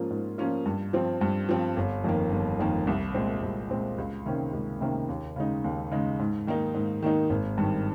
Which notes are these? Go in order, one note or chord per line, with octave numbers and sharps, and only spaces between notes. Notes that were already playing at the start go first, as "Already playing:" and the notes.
Already playing: G#2 F3 A#3 C#4 F4
G#2
F3 A#3 C#4 F4
G2
F3 C4
G2
F3 C4
G1
F2 D#3 A#3
G1
F2 D#3 A#3
C2
A#2 G#3 C4
C2
A#2 G#3 C4
C#2
C3 D#3 A#3 C#4
C#2
C3 D#3 A#3 C#4
D#2
C#3 G#3 D#4
D#2
C#3 G#3 D#4
G#2
D#3 A#3 D#4
G#2
D#3 A#3 D#4
G#1
G2 D#3